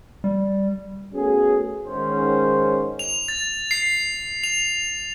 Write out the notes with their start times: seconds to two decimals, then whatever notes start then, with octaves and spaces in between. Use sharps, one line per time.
0.24 G3
1.13 A3 B3 C#4 F#4 G#4
1.86 G#2 D#3 C#4 C5
2.99 F7
3.28 A6
3.71 C7
4.43 F7